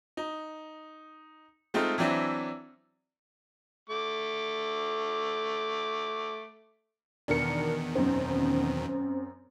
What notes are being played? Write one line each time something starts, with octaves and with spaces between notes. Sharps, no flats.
D#4
G#3 A3 C4 D#4 F4
E3 F#3 C4 D4 E4
A3 D6
E2 B2 D#3 D4 A#4 C#7
F#2 C4